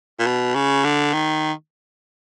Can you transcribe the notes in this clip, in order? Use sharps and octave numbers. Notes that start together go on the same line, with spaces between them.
A#2
B2
C#3
D3
D#3